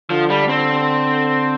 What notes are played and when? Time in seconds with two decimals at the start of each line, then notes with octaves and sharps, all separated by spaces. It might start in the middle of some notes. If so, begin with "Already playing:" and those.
0.10 D3 F3
0.30 G3
0.49 C4